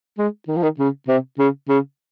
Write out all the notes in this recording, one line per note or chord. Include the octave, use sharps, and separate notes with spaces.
G#3
D#3
F3
D#3
C#3
C3
C#3
C#3